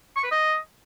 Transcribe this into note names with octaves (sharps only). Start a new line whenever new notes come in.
C#6
B4
D#5